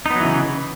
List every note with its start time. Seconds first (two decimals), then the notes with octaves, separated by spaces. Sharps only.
0.06 D#4
0.10 B3
0.15 F#3
0.20 E3
0.25 C#3